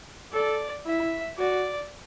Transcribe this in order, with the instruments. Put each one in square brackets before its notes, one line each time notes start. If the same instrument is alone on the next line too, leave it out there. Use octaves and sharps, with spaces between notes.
[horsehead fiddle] A4 [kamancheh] D5
[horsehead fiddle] E4 [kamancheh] E5
[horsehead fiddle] F#4 [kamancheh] D5